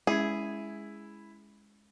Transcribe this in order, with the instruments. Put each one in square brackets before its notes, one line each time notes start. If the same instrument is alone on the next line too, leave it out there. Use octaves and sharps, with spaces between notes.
[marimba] G#3 C#4 G#6 [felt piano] E4 [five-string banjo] G#4